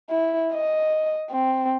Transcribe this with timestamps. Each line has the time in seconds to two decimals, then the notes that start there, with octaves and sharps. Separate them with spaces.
0.10 E4
0.53 D#5
1.31 C4